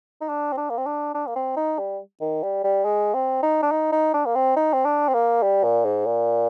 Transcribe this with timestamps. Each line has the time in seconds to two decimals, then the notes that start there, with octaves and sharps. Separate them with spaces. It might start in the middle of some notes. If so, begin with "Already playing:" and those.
0.21 D#4
0.29 D4
0.52 C4
0.57 D4
0.70 A#3
0.78 C4
0.86 D4
1.15 D4
1.27 A#3
1.36 C4
1.57 D#4
1.79 G3
2.21 D#3
2.43 G3
2.64 G3
2.85 G#3
3.14 C4
3.43 D#4
3.63 D4
3.71 D#4
3.93 D#4
4.14 D4
4.26 A#3
4.35 C4
4.56 D#4
4.73 C4
4.85 D4
5.08 C4
5.14 A#3
5.43 G3
5.64 A#2
5.85 G#2
6.06 A#2